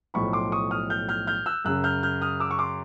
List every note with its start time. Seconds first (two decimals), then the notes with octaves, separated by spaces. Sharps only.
0.14 B1 A2 F3 B5 C#6
0.33 C6 D6
0.52 C#6 D#6
0.71 D#6 F6
0.90 F6 G6
1.09 F6 G6
1.27 F6 G6
1.46 E6 F#6
1.65 F#2 C#3 F#3 E6 F#6
1.84 F6 G6
2.03 F6 G6
2.21 D#6 F6
2.40 D6 E6
2.51 C#6
2.59 C6 D6